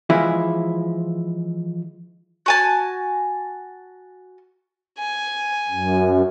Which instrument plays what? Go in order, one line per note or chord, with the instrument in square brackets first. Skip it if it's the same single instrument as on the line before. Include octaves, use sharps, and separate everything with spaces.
[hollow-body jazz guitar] E3 F3 G#3 E4
[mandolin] F#4 G#5 A5
[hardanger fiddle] G#5
[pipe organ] F#2